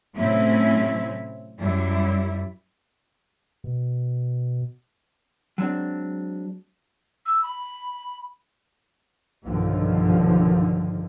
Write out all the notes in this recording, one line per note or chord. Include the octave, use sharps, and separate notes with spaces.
A2 C3 F#3 C4 C#4 E4
F#2 G3 E4
B2
F#3 G#3 C4 D4
E6
B5
B1 G2 D3 D#3 F3